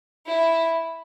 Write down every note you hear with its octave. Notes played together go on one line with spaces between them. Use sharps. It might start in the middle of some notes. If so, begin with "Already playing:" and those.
E4